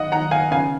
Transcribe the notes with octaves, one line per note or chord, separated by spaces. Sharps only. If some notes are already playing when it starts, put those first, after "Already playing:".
Already playing: D#3 D#5 F#5
D#3 F#5 A#5
F5 G#5
C#3 F5 G#5